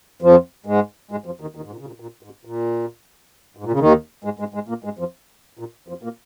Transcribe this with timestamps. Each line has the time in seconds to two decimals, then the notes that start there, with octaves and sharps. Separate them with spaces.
0.22 F2 F3
0.66 G#2 G#3
1.11 G#2 G#3
1.26 F2 F3
1.40 D#2 D#3
1.55 D#2 D#3
1.64 G#2
1.72 A#2
1.79 C#3
1.86 A#2
2.00 A#2
2.23 G#2
2.45 A#2
3.57 G#2
3.64 A#2
3.72 C#3
3.79 D#2 D#3
4.24 G#2 G#3
4.39 G#2 G#3
4.54 G#2 G#3
4.69 A#2 A#3
4.84 G#2 G#3
4.99 F2 F3
5.59 A#2
5.88 F2 F3
6.03 A#2 A#3